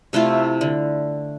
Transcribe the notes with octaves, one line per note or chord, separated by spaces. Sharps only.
C3 A3 E4 F4
D3